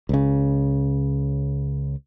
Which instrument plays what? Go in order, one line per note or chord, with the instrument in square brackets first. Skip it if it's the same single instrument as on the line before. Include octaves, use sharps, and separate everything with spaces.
[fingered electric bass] C#2 C#3